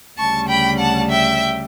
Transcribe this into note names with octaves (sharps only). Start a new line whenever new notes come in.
D2 C#3 G3 A5 C#6
G5 B5
F#5 A5
E5 G5